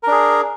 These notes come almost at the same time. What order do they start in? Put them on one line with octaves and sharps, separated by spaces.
A#4 D4 G#4